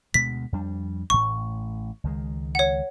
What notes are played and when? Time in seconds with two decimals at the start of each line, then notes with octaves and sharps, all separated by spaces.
0.14 D2 B2 G#3 B6
0.52 F2 G3 D4
1.10 A1 A2 C#6
2.04 C#2 D#3 G#3
2.55 C#5 F#5